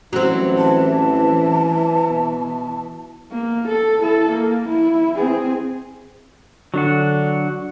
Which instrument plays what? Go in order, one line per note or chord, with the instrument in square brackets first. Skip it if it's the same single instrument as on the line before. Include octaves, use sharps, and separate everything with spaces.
[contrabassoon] A1 [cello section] E3 [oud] F#3 C4
[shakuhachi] A5
[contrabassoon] B2
[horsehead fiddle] A#3
A4
E4 A4
A#3
E4
C4 G#4
[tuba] D3 [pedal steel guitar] F#3 D4 F#4